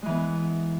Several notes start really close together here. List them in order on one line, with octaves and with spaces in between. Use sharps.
G#3 E3 B3